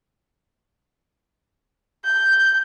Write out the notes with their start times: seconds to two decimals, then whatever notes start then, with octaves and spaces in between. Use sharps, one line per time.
2.04 G6